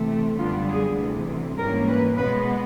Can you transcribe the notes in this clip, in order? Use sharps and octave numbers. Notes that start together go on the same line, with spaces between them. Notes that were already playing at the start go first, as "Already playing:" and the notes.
Already playing: C3 E3 A3
F#2 D3 G3 B3 D4 F4
G#4
D2 C3 E3
G#2 E3 G3 A#3 C#4 A#4
B4
B2 G#3 B3 B4